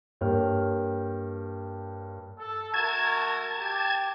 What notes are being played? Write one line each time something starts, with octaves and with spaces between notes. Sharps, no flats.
G2 A#3 C#5 G5 F6
A4
A3 F#4 A#4 A5 G#6
G4